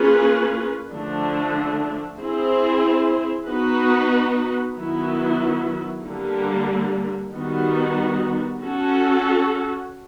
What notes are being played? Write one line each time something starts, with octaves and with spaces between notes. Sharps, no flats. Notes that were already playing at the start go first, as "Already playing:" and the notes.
Already playing: A#3 C#4 F4 G#4 B4
D3 F3 A3 D4
C4 E4 G#4 C5
B3 D#4 F#4 B4
D#3 F#3 B3 E4
D3 G3 A#3
D#3 G3 B3 D#4 F#4
C#4 F#4 A4